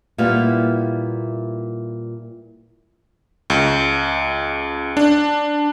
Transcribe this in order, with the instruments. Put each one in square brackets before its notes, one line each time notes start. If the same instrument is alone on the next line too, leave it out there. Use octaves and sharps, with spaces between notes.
[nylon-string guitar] A#2 G3 B3 E4 F5
[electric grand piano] C#2
D4